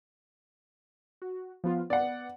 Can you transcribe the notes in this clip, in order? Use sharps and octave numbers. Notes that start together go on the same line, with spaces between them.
F#4
F3 B3 F4
B3 D5 F#5